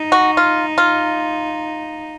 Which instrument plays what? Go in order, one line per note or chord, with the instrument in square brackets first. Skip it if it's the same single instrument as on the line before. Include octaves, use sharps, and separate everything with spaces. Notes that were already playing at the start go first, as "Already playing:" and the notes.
Already playing: [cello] D#4
[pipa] F#4
F4
F4